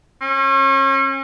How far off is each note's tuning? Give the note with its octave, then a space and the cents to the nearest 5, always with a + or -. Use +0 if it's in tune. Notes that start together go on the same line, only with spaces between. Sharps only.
C#4 -35